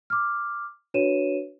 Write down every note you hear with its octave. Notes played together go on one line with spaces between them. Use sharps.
D6 F6
D4 F#4 B4 C#5 D#7 E7